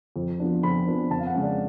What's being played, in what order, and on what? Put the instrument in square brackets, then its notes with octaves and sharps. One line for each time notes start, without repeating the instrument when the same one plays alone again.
[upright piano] F2
F3 B3 D4
F2 B5
F3 B3 D4
F2 A5
F5
F#5
C#3 G#3 C#4
D5